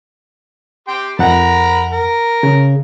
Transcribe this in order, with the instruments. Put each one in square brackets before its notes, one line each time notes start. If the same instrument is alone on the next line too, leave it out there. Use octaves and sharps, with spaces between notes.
[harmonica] G4 G5 C6
[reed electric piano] F2 F#5 [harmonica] A#4 A#5 B5
[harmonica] A#4
[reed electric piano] C#3